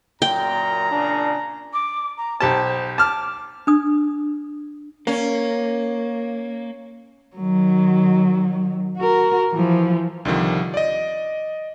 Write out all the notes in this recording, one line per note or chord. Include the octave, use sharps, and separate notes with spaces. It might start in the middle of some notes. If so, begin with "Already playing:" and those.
F#2 A#2 G5 A#5
A#2 C#3 D4
D6
A#5
B1 G4 C5 A5
A5 D6 F6
D4 D#6
A#3 C#4
D#3 F#3
F#4 A#4
E3 F3
C2 D3 D#3 F3 G3
D5 D#5